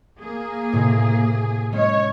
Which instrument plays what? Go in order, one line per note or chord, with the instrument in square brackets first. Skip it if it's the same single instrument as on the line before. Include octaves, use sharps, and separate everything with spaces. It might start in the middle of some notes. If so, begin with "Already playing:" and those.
[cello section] A#3 G#4
[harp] A2 C3
[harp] G#3 C#4 [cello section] C#5